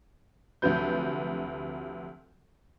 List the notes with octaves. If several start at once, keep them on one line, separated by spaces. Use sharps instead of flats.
D2 C3 F3 F#3 B4 G6